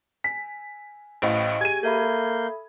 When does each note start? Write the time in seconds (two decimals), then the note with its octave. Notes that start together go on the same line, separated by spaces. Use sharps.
0.24 G#5 B6
1.22 A1 A2 C5 D#5 F5
1.61 G4 G#4 G#5 G#6 D#7
1.83 A#3 A4 E5 B5 G6